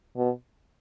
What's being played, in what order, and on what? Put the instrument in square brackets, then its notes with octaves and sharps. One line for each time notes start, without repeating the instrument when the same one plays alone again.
[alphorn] B2